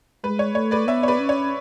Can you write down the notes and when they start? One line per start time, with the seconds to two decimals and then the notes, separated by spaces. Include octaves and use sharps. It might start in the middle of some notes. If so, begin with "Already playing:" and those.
0.24 G#3 B4
0.39 C#5
0.55 A3 C#5
0.71 B4 D5
0.88 B3 C#5 E5
1.03 C#5
1.08 B4 D5
1.19 C#4
1.29 C#5